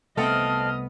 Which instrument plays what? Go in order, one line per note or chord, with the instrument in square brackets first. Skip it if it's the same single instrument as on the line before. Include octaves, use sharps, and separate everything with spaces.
[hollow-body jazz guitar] C2 A3 B3 [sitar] C4 A4 [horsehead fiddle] D#5 [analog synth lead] F6